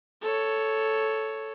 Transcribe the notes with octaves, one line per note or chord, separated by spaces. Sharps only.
A4 C#5